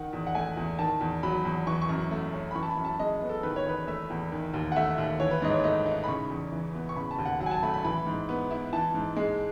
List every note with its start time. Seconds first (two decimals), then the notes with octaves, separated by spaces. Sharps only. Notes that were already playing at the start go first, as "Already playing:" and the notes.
Already playing: D#3 F#5
0.13 E2
0.27 F#5
0.35 A3 G#5
0.57 E2
0.79 D#3 A5
1.01 E2
1.23 F#3 B5
1.45 E2
1.67 E3 C#6
1.82 C#6
1.89 F#2
2.11 A3
2.33 C#4
2.51 B5
2.55 E3 C#6
2.63 A5
2.70 B5
2.77 F#2
2.85 A5
2.99 G#3 D#5
3.22 B3
3.29 A4
3.43 D#3 B4
3.56 C#5
3.66 E2 B4
3.87 A3 E5
4.10 E2
4.32 D#3
4.54 D#2
4.72 F#5
4.76 A3 E5
4.98 D#2
5.20 E3 C#5
5.31 B4
5.42 G#2 D#5
5.53 C#5
5.64 A3 D#5
5.86 D#4
6.04 B5
6.08 C#3 C#6
6.30 E2
6.52 E3
6.75 B3
6.89 C#6
6.96 C#3 B5
7.11 A5
7.18 D#2
7.26 F#5
7.40 F#3 F#5
7.46 G#5
7.51 A5
7.63 A3 B5
7.74 B5
7.85 E3 B5
8.07 G#2
8.29 B3
8.51 E4
8.73 E3 A5
8.94 G#2
9.16 G#3